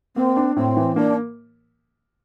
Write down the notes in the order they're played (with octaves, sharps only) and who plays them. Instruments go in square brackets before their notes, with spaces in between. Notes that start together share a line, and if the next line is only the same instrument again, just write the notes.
[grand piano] A#3 [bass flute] C4
[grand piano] D4
[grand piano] A2 [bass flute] C4
[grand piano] E3
[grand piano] A#3 [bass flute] D4